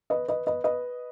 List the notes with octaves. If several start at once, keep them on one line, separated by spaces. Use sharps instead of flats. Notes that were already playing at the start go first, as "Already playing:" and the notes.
B4 D#5
B4 D#5
B4 D#5
B4 D#5